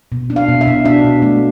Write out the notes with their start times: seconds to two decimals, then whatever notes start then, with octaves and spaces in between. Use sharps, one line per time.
0.12 B2
0.30 D4
0.36 F5
0.48 B2
0.61 E5
0.67 B2
0.85 D4 E5
1.04 B2
1.22 A3